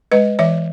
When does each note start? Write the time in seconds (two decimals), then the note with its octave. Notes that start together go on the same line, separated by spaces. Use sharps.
0.12 G#3 B4 D#5
0.39 E3 C#5 E5